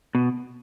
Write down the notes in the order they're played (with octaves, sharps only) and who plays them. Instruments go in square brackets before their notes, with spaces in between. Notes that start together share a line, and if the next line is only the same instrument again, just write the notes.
[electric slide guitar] B2